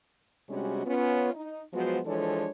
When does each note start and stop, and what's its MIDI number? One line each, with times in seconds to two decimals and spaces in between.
0.49 0.86 48
0.49 0.86 55
0.49 0.86 56
0.49 0.86 61
0.49 0.86 62
0.49 0.86 66
0.86 1.33 59
0.86 1.33 61
0.86 1.33 65
1.34 1.63 63
1.74 1.99 53
1.74 1.99 54
1.74 1.99 56
1.74 1.99 59
1.74 1.99 66
1.74 1.99 72
2.06 2.47 52
2.06 2.47 53
2.06 2.47 56
2.06 2.47 62
2.06 2.47 69
2.06 2.47 73